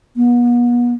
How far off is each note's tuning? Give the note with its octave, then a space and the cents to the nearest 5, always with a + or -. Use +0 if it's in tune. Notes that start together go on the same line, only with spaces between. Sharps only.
B3 -40